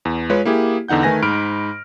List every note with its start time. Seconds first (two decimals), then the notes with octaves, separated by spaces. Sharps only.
0.05 E2
0.30 G#3 F4 B4 C#5
0.45 A#3 E4 G4 G#4
0.88 E2 D3 D#4 F#5 G6
1.03 D#3 A3 B4 G#5 A#6
1.22 G#2 B5 F6 D7